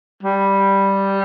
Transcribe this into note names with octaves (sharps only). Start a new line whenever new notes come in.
G3